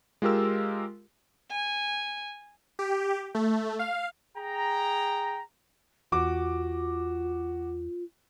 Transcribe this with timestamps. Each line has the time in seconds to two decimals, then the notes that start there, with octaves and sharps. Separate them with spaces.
0.22 G#3 F4 G4 A#4 E6
1.51 G#5
2.79 G4
3.35 A3
3.79 F5
4.37 G#4 G5 A#5
6.12 E2 F4 F#4 D6